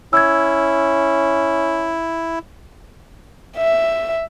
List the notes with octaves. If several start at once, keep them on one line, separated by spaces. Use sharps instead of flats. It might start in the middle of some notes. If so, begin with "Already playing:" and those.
C#4 E4 E6 G#6
E5